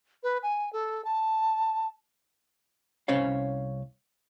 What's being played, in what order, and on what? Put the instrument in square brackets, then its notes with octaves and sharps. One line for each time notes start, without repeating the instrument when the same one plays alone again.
[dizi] B4
G#5
A4
A5
[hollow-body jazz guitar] C2 C#4 C5 C#5 F5